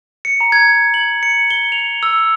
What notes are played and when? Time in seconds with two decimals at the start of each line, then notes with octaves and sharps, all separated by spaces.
0.25 C#7
0.41 A#5
0.52 G#6
0.94 F#7
1.23 C#7
1.51 G7
1.72 F7
2.03 E6